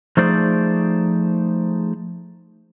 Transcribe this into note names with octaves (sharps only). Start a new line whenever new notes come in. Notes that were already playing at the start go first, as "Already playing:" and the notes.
F3 A3 D#4 G#4 C5 D5